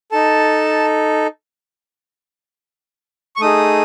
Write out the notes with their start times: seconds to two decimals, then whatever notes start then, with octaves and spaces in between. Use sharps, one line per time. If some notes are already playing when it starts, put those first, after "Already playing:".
0.12 D#4 A4 A5
3.36 C#6
3.40 A3 D#4 G#4 D#6